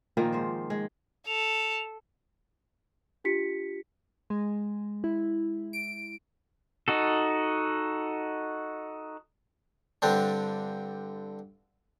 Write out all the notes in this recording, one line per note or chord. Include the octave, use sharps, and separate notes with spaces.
A#2 D#3 F3 A#3
G#2 C5
G#3
A4 F7
D4 F4 G4 B6 C#7
G#3
E4
D7
D#4 F#4 A4
G2 D3 C4 D4